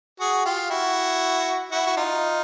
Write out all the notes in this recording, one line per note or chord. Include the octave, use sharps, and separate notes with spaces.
F#4 G#4
F4 G4
E4 F#4
E4 F#4
F#4
D#4 F4